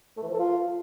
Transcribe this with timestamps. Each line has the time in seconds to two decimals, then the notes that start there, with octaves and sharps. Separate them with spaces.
0.17 A3
0.23 E3
0.28 F3
0.34 A4
0.40 F4